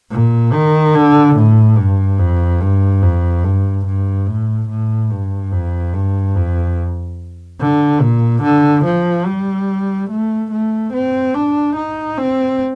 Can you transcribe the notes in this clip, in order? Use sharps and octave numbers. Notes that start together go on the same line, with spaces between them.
A#2
D#3
D3
A2
G2
F2
G2
F2
G2
G2
A2
A2
G2
F2
G2
F2
D3
A#2
D3
F3
G3
A3
A3
C4
D4
D#4
C4